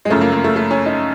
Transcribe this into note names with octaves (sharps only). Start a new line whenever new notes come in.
G#3
F#2 C#3 F3 A3
A#3
A#3
A3
A3
C#4
D#4